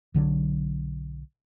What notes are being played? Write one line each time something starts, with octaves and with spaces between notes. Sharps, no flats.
B1 D3 F#3